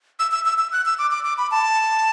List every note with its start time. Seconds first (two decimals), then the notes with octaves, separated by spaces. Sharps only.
0.19 E6
0.32 E6
0.46 E6
0.58 E6
0.72 F#6
0.86 E6
0.99 D6
1.11 D6
1.25 D6
1.38 B5
1.51 A5